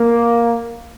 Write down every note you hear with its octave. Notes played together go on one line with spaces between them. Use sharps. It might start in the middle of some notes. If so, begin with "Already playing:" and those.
Already playing: A#3